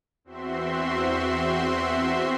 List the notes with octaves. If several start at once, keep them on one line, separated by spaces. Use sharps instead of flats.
E2 C4 F#4 E5 C6